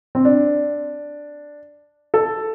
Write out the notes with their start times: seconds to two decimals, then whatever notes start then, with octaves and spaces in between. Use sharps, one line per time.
0.15 C4
0.25 D4
2.14 A4